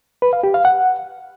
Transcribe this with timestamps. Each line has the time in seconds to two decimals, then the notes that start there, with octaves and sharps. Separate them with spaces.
0.22 B4
0.33 F5
0.43 G4
0.54 F5
0.65 F#5